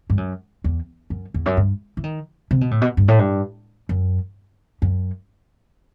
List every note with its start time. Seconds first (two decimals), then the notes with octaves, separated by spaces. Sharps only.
0.10 G2
0.17 F#2
0.64 E2
1.10 F#2
1.34 E2
1.46 F#2
1.57 G2
1.97 E3
2.04 D#3
2.51 C3
2.61 B2
2.71 A2
2.81 B2
2.97 G2
3.08 A2
3.19 G2
3.89 F#2
4.82 F#2